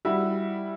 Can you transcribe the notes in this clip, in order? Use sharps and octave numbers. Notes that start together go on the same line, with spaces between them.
G3 E4 F#4